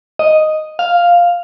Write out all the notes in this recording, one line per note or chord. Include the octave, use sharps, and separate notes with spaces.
D#5
F5